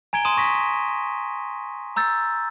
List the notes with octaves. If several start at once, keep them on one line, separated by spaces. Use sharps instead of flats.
G#5 A#5 G#6 D7 G7
C6 D#6 D#7 E7
C#6 A#6 B6
A#5 E6 G6 A6